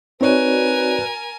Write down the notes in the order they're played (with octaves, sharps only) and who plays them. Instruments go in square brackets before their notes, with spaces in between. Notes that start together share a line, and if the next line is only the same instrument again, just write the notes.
[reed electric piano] C4 D#4 C#5 [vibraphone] F#4 D5 [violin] A#4 G#5 [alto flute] B4